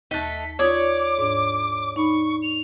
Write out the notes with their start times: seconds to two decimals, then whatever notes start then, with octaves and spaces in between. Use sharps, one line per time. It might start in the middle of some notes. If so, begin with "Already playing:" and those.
0.11 D#2 A3 D#4 F#6 B6
0.59 F4 C#5 D5 D6 D#6 G#6
1.18 G#2 D4
1.96 D#4 B5 C#6
2.42 F7